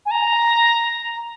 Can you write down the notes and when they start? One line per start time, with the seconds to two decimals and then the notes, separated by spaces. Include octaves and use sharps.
0.06 G#5
0.11 A#5